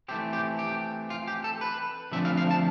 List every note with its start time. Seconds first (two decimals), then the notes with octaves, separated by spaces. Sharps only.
0.08 E3 A3 C4 G4
0.33 G4
0.59 G4
1.10 F4
1.28 G4
1.44 A4
1.61 B4
2.12 D3 F3 A3 C4 E5
2.25 F5
2.37 F5
2.51 A5